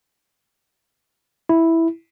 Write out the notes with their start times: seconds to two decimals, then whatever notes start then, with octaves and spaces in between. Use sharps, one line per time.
1.49 E4